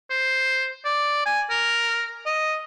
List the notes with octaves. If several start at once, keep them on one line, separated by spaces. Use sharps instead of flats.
C5
D5
G#5
A#4
D#5